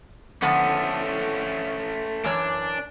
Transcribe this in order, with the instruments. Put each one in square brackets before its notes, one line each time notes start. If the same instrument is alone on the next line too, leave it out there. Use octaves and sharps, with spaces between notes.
[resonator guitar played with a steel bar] D3 F3 B3 [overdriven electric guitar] A3 C#4
[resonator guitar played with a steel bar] F#2 E3 C#5 [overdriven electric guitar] D4